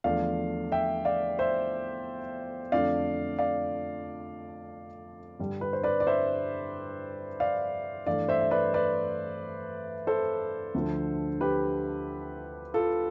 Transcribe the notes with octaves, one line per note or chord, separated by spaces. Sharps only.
E2 D3 F3 A3 D5 F5
E5 G5
D5 F5
C5 E5
F2 D3 F3 A3 D5 F5
D5 F5
G2 D3 G3
B4
C5
B4 D5
D5
C5 E5
D5 F5
G2 E3 A3 D5 F5
C5 E5
E5
B4 D5
B4 D5
A4 C5
D2 D3 F3 A3
G4 B4
F4 A4